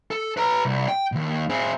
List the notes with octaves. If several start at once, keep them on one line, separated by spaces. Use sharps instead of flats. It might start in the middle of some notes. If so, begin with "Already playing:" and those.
A4
B4 A#5
C2
G5
D#2 B2
C4 G#4